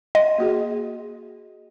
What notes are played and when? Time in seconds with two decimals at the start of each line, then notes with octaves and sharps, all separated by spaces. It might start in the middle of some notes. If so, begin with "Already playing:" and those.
0.15 D#5 C6
0.38 A#3 F#4 G#4